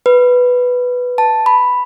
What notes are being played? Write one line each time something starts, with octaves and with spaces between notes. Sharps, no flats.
B4
A5
B5